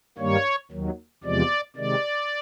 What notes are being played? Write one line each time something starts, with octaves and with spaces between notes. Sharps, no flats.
G2 D#3 G3 A#3 C#5
D#2 D#3 F#3
E2 C3 F3 G#3 D5
C3 D#3 G#3 D5